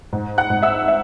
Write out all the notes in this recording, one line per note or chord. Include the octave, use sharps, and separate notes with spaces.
G#2
F#5 F#6
G#2
E5 E6
E5